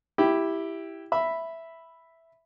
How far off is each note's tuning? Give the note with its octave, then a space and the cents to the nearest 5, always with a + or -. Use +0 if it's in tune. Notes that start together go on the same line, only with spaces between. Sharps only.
E4 +0 G4 +0
E5 +0 B5 +0